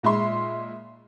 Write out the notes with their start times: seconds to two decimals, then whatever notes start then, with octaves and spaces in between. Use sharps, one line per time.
0.03 A#2 G#3 E5 C6